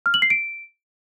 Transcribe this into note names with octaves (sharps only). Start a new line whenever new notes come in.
F6
F#7
C7
D7